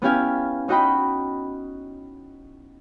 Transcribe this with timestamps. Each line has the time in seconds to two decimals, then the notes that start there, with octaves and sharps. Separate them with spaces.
0.02 B3 C#4 E4 G4 F5 G#5
0.68 C#4 D#4 F#4 D#5 G5 B5